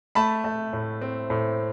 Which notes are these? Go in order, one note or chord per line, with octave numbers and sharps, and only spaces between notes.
A3 A5 B5
A3
A2
C4
A2